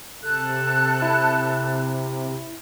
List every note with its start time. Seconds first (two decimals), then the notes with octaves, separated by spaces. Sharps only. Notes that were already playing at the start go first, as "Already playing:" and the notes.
0.22 C3 A4 A5 F#6
1.02 E4